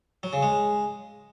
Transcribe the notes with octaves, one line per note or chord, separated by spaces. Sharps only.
F#3
C#3
G#3